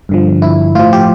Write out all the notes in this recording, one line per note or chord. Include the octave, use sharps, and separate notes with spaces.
G2 D3 F3
E4
A2 F3 F4
G4